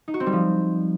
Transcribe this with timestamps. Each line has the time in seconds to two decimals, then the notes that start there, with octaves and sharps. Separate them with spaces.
0.08 D#4
0.14 F#4
0.20 C4
0.26 G3
0.33 F3